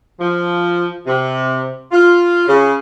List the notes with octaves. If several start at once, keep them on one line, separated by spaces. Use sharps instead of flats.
F3
C3
F4
C#3